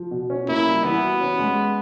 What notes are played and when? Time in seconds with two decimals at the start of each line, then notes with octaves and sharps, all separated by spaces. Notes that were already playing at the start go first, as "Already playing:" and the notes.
Already playing: F3
0.11 B2
0.30 C#4
0.49 A#3 E4
0.67 G3
0.84 E3 B3
1.02 F#4
1.21 C#4
1.39 G#3